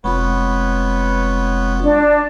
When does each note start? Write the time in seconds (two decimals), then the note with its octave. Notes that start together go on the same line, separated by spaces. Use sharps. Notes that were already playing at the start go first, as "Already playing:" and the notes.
0.04 F1 G#3 B3 C4 F4 B4 C#5
1.82 D4